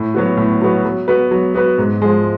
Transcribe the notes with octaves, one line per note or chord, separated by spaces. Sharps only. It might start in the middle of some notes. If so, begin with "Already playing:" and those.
Already playing: A2
F#3 B3 F#4
A2
F#3 B3 F#4
F#3
B3 F#4 B4
F#3
B3 F#4 B4
G#2
F3 G#3